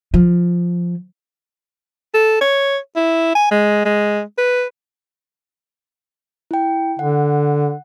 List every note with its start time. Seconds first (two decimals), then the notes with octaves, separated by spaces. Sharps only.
0.14 F3
2.14 A4
2.41 C#5
2.96 E4
3.35 G#5
3.51 G#3
3.85 G#3
4.38 B4
6.51 E4 G5
6.99 D3 F#5